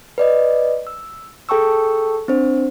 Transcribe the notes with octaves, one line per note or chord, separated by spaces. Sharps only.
B4 D5 D#5
E6
G#4 A4 G5 A5 C#6 E6
C4 D4 C5